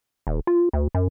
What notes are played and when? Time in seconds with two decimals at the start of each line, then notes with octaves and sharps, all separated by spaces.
0.27 D#1
0.47 F4
0.73 D2
0.95 F#2